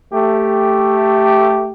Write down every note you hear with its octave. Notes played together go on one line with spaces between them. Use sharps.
A3 G4